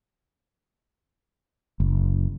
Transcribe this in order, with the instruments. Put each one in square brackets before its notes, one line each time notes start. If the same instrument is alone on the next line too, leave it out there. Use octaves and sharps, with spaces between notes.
[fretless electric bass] F#1